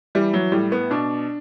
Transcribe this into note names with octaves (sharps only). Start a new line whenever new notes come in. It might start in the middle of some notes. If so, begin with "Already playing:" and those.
E3 G3
F#3
A2 G3
B3
B2 D4